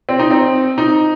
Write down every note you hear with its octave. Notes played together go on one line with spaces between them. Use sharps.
C4
D#4
C4
D#4